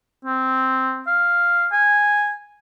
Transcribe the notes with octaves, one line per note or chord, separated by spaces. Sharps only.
C4
F5
G#5